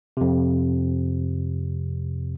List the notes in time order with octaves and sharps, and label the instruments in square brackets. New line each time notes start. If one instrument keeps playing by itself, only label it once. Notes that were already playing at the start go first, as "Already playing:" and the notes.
[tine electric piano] F2 C3